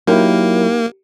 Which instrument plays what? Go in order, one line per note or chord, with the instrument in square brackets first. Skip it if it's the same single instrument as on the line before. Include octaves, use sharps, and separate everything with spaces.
[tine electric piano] F#3 E4 [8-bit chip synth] A#3 [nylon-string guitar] D#4 G4 A#4